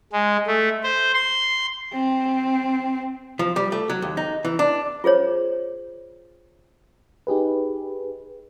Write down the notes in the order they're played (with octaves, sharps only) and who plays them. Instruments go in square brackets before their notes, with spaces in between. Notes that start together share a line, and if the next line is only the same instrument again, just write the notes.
[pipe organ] G#3
A3
C5
C6
[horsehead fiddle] C4
[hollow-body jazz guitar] F3
G3
A3
F#3
D#2
D#4
E3
D4
[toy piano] F4 G#4 C5 C#5
[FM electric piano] D#4 G4 G#4 B4